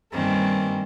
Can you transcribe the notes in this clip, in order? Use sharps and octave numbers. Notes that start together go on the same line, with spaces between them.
G2 D#3 A#3 C4 C#4